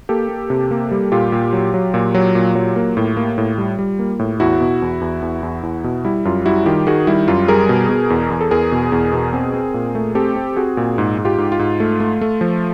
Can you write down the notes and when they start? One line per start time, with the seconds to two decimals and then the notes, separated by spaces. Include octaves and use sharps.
0.09 A#3 G4 A4
0.29 A#3
0.50 C3
0.71 A#3
0.91 G3
1.12 A#2 F4 G4
1.32 A#2
1.53 F#3
1.74 F#3
1.94 A#2
2.14 F#3
2.35 A#2
2.55 F#3
2.76 A#3
2.97 A2
3.17 A#3
3.38 A2
3.58 G3
3.79 G3
3.99 A#3
4.19 A2
4.40 E2 E4 F#4
4.61 B2
4.82 E2
5.01 E2
5.22 E2
5.43 E2
5.63 E2
5.84 B2
6.05 G3 E4
6.25 F#2 F4
6.45 G3 E4 F#4
6.66 D#3 F4 G4
6.87 D#3 F#4 G#4
7.07 G3 E4
7.28 F#2 F4
7.48 G3 G#4 A#4
7.69 B2
7.89 B2
8.10 E2
8.30 E2
8.41 A4
8.51 E2 G#4 A#4
8.72 B2
8.92 E2
9.13 B2
9.33 C4
9.54 C4
9.74 A#2
9.95 A3
10.15 C4 G4 A4
10.36 C4
10.56 C4 F#4 G#4
10.77 A#2
10.98 G#2
11.18 G#2
11.25 F4 G4
11.38 G#2
11.52 F4
11.59 G#2
11.80 A3
12.00 A3
12.21 A3
12.41 F3